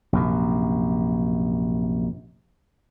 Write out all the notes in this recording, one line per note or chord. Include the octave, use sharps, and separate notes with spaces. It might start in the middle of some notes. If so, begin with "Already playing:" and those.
A#1 F#2 C3